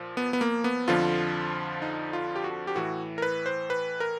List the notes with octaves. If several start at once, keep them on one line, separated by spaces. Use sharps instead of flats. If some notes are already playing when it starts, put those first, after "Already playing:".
Already playing: A#2 F3
B3
B3
A#3
B3
F2 D3 F3 F4
D#4
F4
G4
F#4
G4
A2 E3 F#4
A#4
B4
C5
B4
A#4